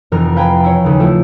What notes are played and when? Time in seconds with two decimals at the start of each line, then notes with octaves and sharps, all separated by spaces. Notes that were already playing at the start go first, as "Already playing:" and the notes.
0.12 F1 F2 E3 A#4 F6
0.36 B4 F5 G5 G#5 A#5 B5
0.64 E4 C#5
0.84 D#2 C#3
0.99 F3 A3 E4 F4